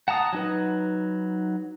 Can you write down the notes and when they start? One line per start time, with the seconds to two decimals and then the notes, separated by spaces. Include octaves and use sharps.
0.08 F#5 A5 A#5 D#6
0.33 F#3 D#4 B4